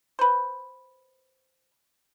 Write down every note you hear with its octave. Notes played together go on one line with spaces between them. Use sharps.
B4 C5